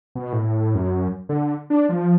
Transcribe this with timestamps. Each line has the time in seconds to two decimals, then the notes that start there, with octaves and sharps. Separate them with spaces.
0.15 B2
0.33 A2
0.75 F#2
1.29 D3
1.70 D4
1.89 F3